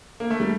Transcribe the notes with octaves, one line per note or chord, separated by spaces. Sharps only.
A#3
A3
G3